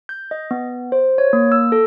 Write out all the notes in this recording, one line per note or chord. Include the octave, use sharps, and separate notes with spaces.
G6
D#5
B3
C5
C#5
A#3
E6
A4